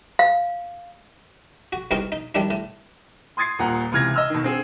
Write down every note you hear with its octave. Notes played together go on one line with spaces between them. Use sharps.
F5
F#4
C2 B2 C4 D#4 A#4 C#6
D#4
D#3 G3 D4 E4
A2
C6 D#6 G#6 A6 C7
D#1 A#2 F#5 A#5
C#2 C3 E3 F6 G#6 A#6
D#5 E6 F6
B2 D#3
D3 C4 G#4